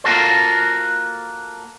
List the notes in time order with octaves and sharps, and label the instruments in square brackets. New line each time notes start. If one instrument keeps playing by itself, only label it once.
[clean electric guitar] A#3 F4 F#4 A4 C5